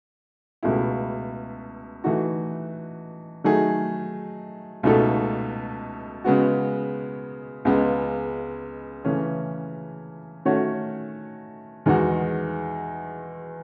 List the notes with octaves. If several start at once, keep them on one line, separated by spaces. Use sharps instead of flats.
C#2 B2 A3 E4
E3 A3 D#4 F#4
D#3 F#3 A3 D#4 G#4
C#2 B2 A3 D#4 A4
C#3 G#3 B3 F#4
C#2 C#3 G#3 B3
C#3 E3 A3 C#4
D#3 A3 C#4 F#4 C#5
E2 D#3 G#3 D#4 F#4